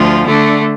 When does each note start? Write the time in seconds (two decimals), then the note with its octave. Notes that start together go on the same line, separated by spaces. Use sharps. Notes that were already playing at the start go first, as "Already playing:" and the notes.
Already playing: D2 F3 F4
0.26 D3 A3 D4